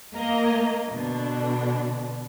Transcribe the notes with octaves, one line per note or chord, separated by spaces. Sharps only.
A#3 A#4 D#5
B2 D3 D4